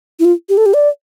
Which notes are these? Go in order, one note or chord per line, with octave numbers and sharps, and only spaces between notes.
E4
F4
G4
A4
G4
D5